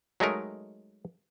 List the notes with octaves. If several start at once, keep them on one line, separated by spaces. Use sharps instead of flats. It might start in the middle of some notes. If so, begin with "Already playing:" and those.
F#3 G#3 A3 D#4 A#4